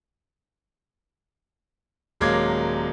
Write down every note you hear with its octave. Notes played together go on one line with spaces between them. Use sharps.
D#1 F#3 G#3 A#3 D6 G#6